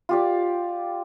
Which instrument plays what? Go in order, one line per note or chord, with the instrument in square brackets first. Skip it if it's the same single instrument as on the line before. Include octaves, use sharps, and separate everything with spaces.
[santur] F4 G4 D5